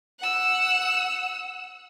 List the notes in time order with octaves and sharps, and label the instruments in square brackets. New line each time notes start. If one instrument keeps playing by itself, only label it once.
[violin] F#5 E6